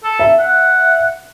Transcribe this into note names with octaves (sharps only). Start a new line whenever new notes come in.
A4
E5
F#5